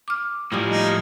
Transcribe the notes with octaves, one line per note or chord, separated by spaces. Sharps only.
D6 F6
A2 F3 G3 A#3 G#4
D#4